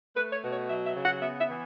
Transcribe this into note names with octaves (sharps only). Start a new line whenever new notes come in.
A3 B4
C#5
B2
C#5
F#3 E5
E5
C#3
F#5
B3 E5
E5
E3